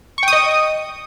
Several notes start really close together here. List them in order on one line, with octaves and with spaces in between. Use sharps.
C#6 G5 D#6 D#5